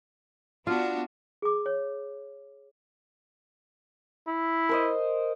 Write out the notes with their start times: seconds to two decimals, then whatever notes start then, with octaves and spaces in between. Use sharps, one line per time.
0.67 B3 D4 F4 F#4
1.42 G#4 D6
1.66 C#5
4.27 E4
4.69 A#4 C5 D#5